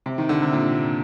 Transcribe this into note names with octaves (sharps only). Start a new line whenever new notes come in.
C3
D#3
D3
C3
A#2